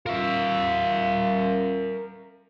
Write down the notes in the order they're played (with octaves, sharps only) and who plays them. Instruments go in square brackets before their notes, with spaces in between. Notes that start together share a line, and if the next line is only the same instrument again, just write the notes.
[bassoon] F4 [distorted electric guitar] A#4 E5